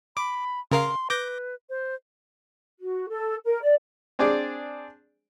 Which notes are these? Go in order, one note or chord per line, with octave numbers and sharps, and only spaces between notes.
B5 D6
C#3 A#4 F5 C6
B4 D6 G6 A#6
C5
F#4
A4
A#4
D5
C4 D4 G#4 D5